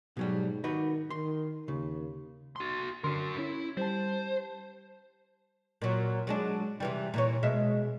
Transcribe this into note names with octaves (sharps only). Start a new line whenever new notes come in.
G#2 B2 F#3 G3
D#3 D#4 F#4 B4
D#3 C6
D#2 C#3
F#4 C6
D3 F#4 A#4 C6
C#4 E4
G3 C5 A5
A#2 F#3
F#3 G#3 D4
C3 E3 G3
A#2 E3 C#5
B2 G#3 E5